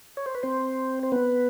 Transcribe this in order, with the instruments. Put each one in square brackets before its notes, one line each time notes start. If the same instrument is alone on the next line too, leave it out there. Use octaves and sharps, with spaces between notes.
[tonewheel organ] C#5
C5
B4
C4 C5
C5
B3 B4